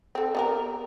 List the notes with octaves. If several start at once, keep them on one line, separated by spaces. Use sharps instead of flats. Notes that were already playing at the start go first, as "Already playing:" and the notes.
C4 A4
B3 G4 A#4